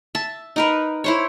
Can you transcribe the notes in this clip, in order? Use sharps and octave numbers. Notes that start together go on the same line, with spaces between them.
E5 A5
D#4 A#4 B4
E4 C5 C#5